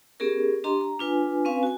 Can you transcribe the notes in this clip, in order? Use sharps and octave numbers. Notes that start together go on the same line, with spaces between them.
B3 C#4 G4 G#4 A#4
D4 G4 D#5 A#5 C6
A#5
D4 F4 B4 G#5
C4 C#4 B4 F5 G#5
F#4 G#5